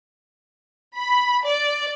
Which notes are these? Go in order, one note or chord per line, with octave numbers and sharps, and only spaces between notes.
B5
D5